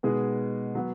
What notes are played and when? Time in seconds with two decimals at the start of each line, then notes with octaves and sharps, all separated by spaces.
0.03 B2 G#3 B3 D#4 G#4
0.75 F#3 B3